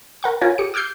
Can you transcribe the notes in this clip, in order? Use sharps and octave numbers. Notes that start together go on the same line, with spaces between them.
A#4 F#5 C#6
F4 F#4 A#4 C#5 G#5
G4 C#7
D6 E6 F6 G6 C7